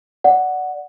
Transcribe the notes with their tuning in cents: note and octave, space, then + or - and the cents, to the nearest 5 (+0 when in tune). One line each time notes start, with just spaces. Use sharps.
D5 +0 F#5 +0